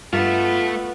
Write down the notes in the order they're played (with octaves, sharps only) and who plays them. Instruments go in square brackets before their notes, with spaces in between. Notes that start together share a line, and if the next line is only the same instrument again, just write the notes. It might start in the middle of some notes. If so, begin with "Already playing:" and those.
[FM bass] G2 [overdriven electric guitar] A3 E5 [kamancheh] B3 [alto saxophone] F4